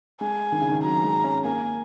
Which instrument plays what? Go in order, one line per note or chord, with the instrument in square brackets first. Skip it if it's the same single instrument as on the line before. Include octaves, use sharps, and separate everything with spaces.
[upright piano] G#3 [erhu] G#5
[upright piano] D#3
C#3
D#3
[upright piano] F#3 [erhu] A#5
[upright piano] G#3
C#4
[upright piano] A#3 [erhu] G#5